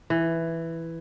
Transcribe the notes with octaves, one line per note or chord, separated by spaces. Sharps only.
E3